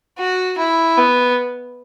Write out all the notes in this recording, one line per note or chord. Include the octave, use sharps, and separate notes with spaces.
F#4
E4
B3